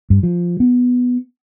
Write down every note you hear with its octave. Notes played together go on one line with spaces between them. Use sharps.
G2
F3
B3